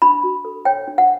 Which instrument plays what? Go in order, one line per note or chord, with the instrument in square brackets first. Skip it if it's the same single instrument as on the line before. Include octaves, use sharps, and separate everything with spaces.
[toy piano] D4 B5
F#4
A4
C#5 G5
D4
F#5